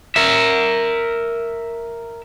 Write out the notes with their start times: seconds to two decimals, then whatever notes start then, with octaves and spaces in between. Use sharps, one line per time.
0.16 A#4 E5